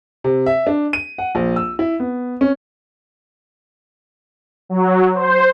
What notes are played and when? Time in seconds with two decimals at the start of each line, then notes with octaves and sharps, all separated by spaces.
0.24 C3
0.46 E5
0.67 D4
0.93 D#7
1.18 F#5
1.35 A#1
1.56 E6
1.79 E4
2.00 B3
2.41 C#4
4.69 F#3
5.15 C5